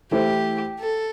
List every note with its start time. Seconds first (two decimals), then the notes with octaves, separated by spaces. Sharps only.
0.11 E3 A3 E4 G4 A4 C5
0.80 A4